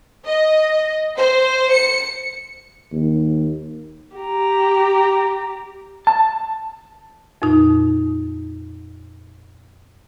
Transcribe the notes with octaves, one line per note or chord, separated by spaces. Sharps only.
D#5
C5
C#7
D#2
G4 A#5
A5
F2 A#2 D#4